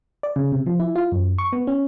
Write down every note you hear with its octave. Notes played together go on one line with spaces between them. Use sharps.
D5
C#3
C3
F3
E4
F4
F#2
C#6
B3
C#4